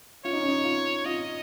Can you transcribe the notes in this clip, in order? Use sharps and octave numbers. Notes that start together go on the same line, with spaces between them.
F4 C#5
D#4
C#4
D#4
F4
F4 D#5